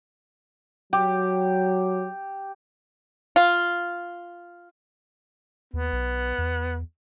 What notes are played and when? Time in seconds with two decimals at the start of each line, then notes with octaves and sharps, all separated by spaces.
0.93 F#3 G4
3.36 F4
5.73 D#2 B3
5.92 B1
6.38 E2